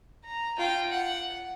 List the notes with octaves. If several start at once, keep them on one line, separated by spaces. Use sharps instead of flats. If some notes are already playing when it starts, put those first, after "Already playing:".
A#5
F4 G5
F#5